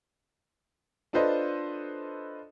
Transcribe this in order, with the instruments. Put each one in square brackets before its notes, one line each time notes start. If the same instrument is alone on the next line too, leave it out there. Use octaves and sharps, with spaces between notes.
[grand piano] D4 F4 A4 B4 C5 D#5